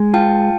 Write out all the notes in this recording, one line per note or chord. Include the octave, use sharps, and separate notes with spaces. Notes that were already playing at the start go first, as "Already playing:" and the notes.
Already playing: G#3
F4 G5 A5